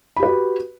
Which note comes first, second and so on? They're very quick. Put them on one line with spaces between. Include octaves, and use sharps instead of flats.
B5 G4 B4 F#4